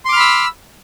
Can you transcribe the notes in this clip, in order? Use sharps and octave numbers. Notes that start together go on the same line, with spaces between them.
B5 C6 D6 E6 F6